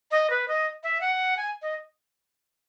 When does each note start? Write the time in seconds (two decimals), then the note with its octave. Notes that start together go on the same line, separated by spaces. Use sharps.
0.11 D#5
0.30 B4
0.48 D#5
0.83 E5
1.01 F#5
1.37 G#5
1.62 D#5